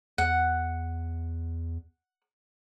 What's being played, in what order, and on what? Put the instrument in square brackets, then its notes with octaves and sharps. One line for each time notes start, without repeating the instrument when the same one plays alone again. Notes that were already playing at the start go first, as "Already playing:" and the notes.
[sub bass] E2 [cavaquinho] F#5